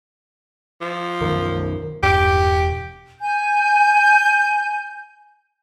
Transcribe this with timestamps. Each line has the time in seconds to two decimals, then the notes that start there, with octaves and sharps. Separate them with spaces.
0.81 F3
1.21 F#2 D#3 D#4 A#4
2.03 E1 G2 G4
3.20 G#5 G6